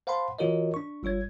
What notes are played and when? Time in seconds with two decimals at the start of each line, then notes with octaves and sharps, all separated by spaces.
0.07 C5 F5 F#5 A5 B5 C6
0.39 E3 F4 F#4 A#4 C#5 D#5
0.74 D4 C#6
1.03 G1 G3 F4 C#5 G#6